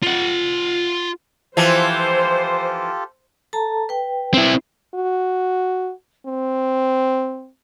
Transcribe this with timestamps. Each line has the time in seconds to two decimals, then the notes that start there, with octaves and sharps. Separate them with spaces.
0.03 F4 F#5
1.57 E3 F3 F4 G4 A4 C5
3.53 A4 A5 A#5
3.89 B4 G5
4.34 C4 E4
4.95 F#4
6.26 C4